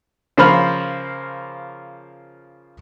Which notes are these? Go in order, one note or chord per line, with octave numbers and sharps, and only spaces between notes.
C#3 F3 A#3 C5 B5 F6